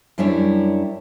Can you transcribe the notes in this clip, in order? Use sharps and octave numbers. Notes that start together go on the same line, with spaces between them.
F#2 G3 D4 E4 C#5